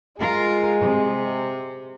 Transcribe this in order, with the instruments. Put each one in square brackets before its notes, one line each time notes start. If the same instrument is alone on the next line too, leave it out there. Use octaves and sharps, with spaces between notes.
[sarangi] G#3 [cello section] F4 A#4
[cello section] C3